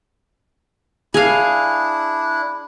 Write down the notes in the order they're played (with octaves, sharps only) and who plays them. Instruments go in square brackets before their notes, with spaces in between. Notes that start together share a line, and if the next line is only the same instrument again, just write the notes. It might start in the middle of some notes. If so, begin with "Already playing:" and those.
[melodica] D4 E4 [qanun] G#4 F5